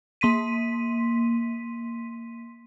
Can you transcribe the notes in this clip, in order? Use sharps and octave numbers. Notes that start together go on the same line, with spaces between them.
A#3 C6 B6 D#7